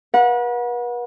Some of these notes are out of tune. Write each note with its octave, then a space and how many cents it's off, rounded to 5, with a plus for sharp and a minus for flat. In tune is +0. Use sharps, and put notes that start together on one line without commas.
B4 -40 F#5 -30